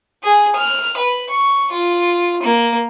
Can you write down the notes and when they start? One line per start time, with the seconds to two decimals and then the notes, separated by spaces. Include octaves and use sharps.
0.23 G#4
0.55 F6
0.98 B4
1.29 C#6
1.72 F4
2.43 A#3